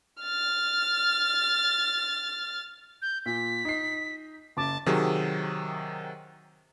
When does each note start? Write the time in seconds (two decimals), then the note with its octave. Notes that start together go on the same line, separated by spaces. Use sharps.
0.22 F6 A6
3.02 G6
3.26 A#2 B6
3.65 D#4 C7
4.57 F#1 A5 D6
4.86 C3 D#3 F#3 G#4